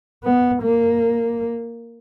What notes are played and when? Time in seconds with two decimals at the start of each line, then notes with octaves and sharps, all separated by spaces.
0.24 B3
0.63 A#3